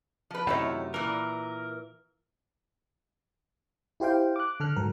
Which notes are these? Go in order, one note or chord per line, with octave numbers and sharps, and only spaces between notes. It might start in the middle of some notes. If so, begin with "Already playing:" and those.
F3 B4
F#2 C3 D#3 A3 E4 C#5
A#2 E3 A#4
E4 G4 C5 F5 G5
D6 F#6
D3 A4 F6 F#6
G#2 F#3 A#4